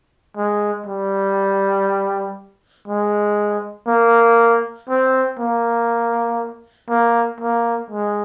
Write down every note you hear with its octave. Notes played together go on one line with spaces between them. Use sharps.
G#3
G3
G#3
A#3
C4
A#3
A#3
A#3
G#3